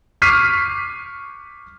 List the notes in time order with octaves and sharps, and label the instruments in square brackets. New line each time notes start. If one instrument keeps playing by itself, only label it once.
[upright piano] C#6 D6 F6 B6 C7 D#7